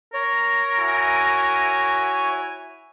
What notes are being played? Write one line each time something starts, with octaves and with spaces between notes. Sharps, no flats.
A#4 C#5
E4 F#4 G#5